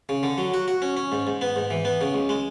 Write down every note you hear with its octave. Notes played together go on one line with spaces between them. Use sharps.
C#3
D3
F#3
F#4
F#4
C#4
C#4
G#2
G#2
B3
G#2
E3
B3
C#3
C#2
G#3